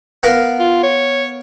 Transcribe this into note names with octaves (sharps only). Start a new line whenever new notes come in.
B3 A#4 F5
F4
C#5